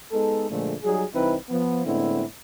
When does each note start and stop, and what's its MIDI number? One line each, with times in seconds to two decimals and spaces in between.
0.12 0.45 56
0.12 0.45 59
0.12 0.45 63
0.12 0.45 69
0.49 0.74 46
0.49 0.74 50
0.49 0.74 53
0.49 0.74 56
0.49 0.74 57
0.83 1.03 54
0.83 1.03 55
0.83 1.03 63
0.83 1.03 68
1.14 1.36 36
1.14 1.36 52
1.14 1.36 60
1.14 1.36 63
1.14 1.36 64
1.14 1.36 71
1.50 1.84 53
1.50 1.84 59
1.85 2.23 45
1.85 2.23 50
1.85 2.23 56
1.85 2.23 59
1.85 2.23 60
1.85 2.23 64